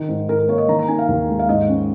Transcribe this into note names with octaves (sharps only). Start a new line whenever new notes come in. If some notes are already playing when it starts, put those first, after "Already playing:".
Already playing: D#3 D#4
G#2
G#2 A#4
A#4
A#3 C#5
D#5
D#3 A#5
A#5
D#4 G#5
F5
D#2
G#3
F5
G#2 D#5
C#4